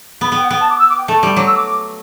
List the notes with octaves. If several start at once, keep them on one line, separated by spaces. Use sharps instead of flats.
B3 B5
B3 G5
F#5
B3 G5
A5
D6
E6
D6
G5
A3 A5
G3
F#3 D6
E6
D6